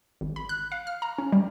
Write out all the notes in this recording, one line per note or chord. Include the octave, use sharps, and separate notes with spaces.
G#1
B5
F#6
F5
F6
A#5
C#4
G3